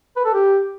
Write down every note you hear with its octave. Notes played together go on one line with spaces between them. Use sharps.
B4
A4
G4